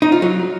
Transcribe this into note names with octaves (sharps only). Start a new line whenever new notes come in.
D#4
F4
F#3